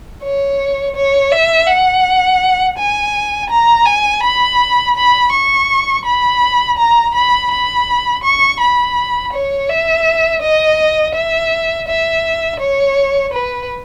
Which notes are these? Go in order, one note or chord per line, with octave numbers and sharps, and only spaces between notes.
C#5
C#5
E5
F#5
G#5
A#5
G#5
B5
B5
C#6
B5
A#5
B5
B5
C#6
B5
C#5
E5
D#5
E5
E5
C#5
B4